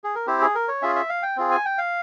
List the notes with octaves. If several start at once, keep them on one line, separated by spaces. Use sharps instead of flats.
G#4
A#4
C4 E4 G4 C5
G#4
A#4
C#5
C#4 F4 G#4 E5
E5
F5
G5
C4 F4 G#4
G#5
G5
F5